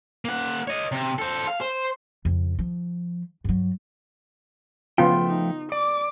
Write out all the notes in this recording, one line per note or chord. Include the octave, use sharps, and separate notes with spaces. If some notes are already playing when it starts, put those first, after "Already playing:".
A#3 F#5
C#5 D#5
C3
A4 C5
F5
C5
F2 C#3
F3
G2 F#3
C#3 F3 A3 B3 F4 G5
D#4
D5 D6